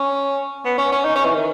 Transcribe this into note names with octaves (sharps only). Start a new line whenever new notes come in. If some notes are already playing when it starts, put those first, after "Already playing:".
Already playing: C#4
B3
C#4
C#4
D#4
C#4
E3
D#3